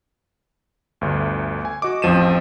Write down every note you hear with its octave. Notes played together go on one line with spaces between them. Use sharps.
G1 D2
G#5
F#4 D#5 D6
A1 F2 F3 D#7 E7